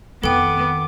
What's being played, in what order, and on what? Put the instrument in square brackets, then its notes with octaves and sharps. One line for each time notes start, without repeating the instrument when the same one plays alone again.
[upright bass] F2 D#3 [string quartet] B3 [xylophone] A4 G5 [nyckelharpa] D6